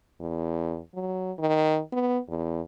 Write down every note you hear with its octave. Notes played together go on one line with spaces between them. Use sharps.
E2
F#3
D#3
B3
E2